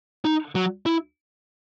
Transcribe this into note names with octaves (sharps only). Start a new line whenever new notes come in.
D#4
F#3
E4